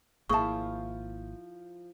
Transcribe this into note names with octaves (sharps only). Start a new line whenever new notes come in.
G#1 F3 A#3 E4 G#4 A5 C#6